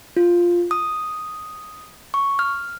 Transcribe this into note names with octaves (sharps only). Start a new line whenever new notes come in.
F4
D#6
C#6
F6